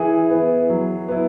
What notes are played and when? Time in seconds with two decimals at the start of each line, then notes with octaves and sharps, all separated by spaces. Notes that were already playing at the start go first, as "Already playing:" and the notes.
Already playing: E3 E4 G#4
0.30 B3 E4
0.70 F#3
1.08 B3 E4